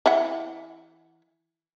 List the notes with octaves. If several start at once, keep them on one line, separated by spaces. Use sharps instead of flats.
E3 E5 F#5